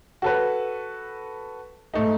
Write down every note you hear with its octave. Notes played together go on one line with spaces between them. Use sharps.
F#4 A4 B4
G#2 A3 D#4